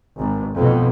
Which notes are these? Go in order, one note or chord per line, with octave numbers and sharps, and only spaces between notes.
G#1
B1 F2 B2